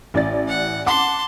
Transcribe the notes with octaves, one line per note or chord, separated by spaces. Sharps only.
A1 D5 A6
F#5
F#5 A5 C6 D6